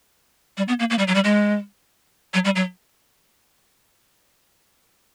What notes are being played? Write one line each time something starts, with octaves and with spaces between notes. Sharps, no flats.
G3
B3
A#3
A#3
G3
F#3
G3
G#3
F#3
G3
F#3